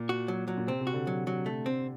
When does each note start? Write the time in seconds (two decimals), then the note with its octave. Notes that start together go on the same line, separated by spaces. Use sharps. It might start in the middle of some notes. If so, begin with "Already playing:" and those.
Already playing: A#2
0.09 F#4
0.28 F#3
0.48 F#3
0.57 A#2
0.67 C3 C4
0.81 C3
0.87 F#4
0.94 D3
1.07 F#3
1.27 F#3
1.46 A3
1.66 C4